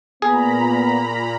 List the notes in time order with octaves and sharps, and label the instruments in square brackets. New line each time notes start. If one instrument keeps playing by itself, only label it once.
[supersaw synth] A#2 A#5 B5 [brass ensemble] B3 [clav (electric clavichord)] G#4